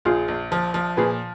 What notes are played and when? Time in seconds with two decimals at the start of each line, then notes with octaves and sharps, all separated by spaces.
0.05 A#1 F4 G#4
0.28 A#1
0.52 F3
0.74 F3
0.97 A#2 G#4 B4